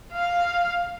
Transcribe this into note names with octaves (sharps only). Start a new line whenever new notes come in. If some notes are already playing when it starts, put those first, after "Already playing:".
F5